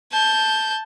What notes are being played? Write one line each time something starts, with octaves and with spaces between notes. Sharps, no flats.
A5 G6